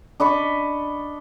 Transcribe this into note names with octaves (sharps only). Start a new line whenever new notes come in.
D4 D#5 B5 C#6